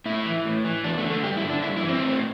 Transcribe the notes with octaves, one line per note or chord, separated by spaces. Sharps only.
A2 E4
E3
A2
E3
E2 D4
A3
D3
A3
G2 G4
E4
D3
D4
G2 E4
E4
E3
C4
A2